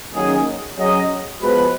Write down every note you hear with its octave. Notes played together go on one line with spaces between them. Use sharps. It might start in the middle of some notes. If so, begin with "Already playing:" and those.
D#3 F#3 A#3 C#4 G#4
F#3 C#4 G#4 D#5
F3 G#3 B3 F#4 B4